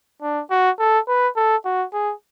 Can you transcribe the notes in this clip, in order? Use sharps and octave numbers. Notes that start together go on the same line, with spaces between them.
D4
F#4
A4
B4
A4
F#4
G#4